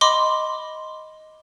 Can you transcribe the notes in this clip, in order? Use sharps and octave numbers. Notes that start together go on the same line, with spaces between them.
D#5 B5 C6 D6